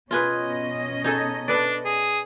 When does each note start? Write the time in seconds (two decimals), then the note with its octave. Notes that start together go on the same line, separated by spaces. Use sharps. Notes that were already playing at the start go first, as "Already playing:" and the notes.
0.11 B2 C#4 F4 G#4 B4 D#5
1.04 D#4 G#4 A4
1.48 D4 A4 B4 D5
1.85 G#4